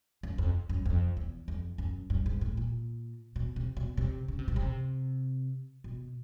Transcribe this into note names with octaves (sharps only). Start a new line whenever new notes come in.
F#2
F2
F#2
F2
E2
F2
F#2
G2
G#2
A2
A#2
B2
C3
B2
C3
C#3
C3
B2
C3
B2